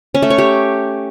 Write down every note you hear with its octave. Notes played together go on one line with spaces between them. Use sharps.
C#4
A3
C#5
G4